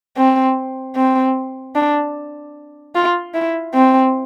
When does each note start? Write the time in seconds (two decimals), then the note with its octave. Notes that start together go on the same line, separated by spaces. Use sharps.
0.17 C4
0.96 C4
1.75 D4
2.95 F4
3.34 E4
3.75 C4